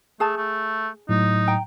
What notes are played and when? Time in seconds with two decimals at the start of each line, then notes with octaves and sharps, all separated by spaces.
0.20 A3 G#4 A5
0.37 A3
1.09 A2 F#3 D#4
1.48 G5 A#5